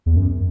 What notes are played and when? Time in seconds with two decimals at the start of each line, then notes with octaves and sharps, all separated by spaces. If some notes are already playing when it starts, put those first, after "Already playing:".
0.06 E2
0.16 F#2